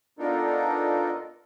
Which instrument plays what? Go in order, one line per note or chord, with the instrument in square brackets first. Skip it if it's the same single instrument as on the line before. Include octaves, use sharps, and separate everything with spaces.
[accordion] B3 D4 D#4 F4 A4 A#4